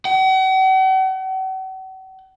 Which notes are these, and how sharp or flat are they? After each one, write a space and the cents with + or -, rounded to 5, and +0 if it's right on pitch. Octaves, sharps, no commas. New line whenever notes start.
F#5 +45